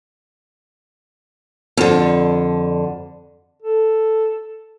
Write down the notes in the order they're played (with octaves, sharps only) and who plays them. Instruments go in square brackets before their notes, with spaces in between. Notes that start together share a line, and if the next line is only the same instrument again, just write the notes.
[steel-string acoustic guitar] F2 D3
[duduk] A4